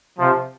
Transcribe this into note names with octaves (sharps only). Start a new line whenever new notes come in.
C3 F3